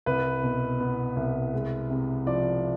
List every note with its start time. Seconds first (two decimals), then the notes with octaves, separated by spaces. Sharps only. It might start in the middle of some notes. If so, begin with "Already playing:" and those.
0.06 C2 B4
0.43 B2
0.80 B3
1.16 C2
1.53 G#3
1.90 C3
2.26 F3 D5